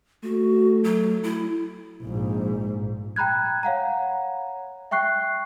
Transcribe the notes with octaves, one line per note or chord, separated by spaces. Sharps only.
A3 F#4
F#3
E4
A#1 G#2
G5 A#5 B5 F#6 G#6
C#5 F5 F#5 A#5
E5 G5 C#6 F#6 C7